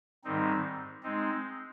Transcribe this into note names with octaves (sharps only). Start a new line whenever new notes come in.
G#2 D#3 G3 C4 D#4
G#3 C4 D#4